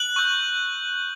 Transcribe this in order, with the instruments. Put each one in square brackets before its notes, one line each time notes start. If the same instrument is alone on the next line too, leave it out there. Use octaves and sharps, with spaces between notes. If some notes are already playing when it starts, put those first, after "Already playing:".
Already playing: [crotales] F#6 F#7
C#6 E6 G6